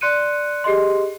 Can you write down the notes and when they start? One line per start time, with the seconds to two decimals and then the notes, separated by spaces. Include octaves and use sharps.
0.01 D5 C6 F#6 C#7 D#7
0.64 G4 G#4 D#5 C6